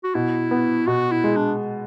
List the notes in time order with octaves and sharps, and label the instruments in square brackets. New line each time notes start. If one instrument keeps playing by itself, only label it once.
[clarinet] F#4
[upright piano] B2 [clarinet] E4
[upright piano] B3
[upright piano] B2 [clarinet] F#4
[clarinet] E4
[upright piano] G#3
[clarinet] D4